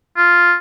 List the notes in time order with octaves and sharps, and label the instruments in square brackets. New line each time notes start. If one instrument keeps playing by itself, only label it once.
[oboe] F4